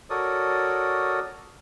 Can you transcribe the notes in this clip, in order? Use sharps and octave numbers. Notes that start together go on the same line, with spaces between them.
F#4 A4 A#4 C#5 D5 D#6